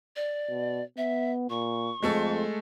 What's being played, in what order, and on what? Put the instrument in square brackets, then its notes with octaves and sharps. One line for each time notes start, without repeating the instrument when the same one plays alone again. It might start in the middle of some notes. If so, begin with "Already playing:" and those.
[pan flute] D5
[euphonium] B2
[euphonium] B3 [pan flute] E5
[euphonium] A#2 [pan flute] C#6
[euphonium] F2 [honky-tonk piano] G#3 A3 A4